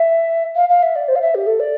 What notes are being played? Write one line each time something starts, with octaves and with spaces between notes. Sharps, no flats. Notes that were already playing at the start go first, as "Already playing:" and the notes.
Already playing: E5
F5
F5
E5
D5
C5
F5
E5
G4
A4
D5